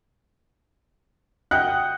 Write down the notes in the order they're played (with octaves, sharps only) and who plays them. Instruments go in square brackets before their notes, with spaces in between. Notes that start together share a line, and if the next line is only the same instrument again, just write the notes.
[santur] D#5 F#5 G5 [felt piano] F#6